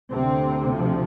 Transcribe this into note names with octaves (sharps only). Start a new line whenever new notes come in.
D2 C3 C4
F3